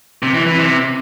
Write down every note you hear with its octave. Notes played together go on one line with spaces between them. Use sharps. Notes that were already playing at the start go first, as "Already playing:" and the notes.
C3
E3
E3
C3